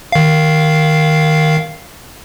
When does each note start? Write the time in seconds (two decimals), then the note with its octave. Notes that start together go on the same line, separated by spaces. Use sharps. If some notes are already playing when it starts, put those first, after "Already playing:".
0.12 D#3 F5